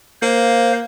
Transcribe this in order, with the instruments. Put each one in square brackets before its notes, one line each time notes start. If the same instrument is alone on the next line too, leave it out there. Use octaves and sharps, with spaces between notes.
[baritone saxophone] A#3 [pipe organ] C5 F5